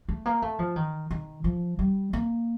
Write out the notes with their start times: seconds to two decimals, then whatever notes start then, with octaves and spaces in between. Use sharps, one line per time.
0.09 A3
0.26 A#3
0.42 A3
0.59 F3
0.76 D#3
1.11 D#3
1.44 F3
1.79 G3
2.13 A#3